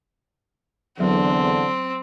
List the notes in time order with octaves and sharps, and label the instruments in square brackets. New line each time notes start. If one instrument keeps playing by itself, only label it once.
[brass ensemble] E2 D3 [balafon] F#3 [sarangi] C4